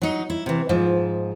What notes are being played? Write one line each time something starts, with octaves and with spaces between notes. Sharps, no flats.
F#3 D#4
E4
C3 E3
G#2 F3